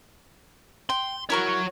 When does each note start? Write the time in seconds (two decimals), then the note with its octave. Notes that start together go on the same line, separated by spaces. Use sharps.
0.90 G5 C6
1.30 E4 F#4 A#4 C#5 C#6